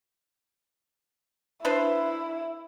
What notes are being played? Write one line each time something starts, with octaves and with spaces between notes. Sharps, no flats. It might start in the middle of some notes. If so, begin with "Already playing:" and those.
D4 E4 B4 C5